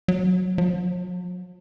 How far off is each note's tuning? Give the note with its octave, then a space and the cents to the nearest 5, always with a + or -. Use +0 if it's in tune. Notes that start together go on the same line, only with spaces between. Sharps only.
F#3 -5
F#3 -45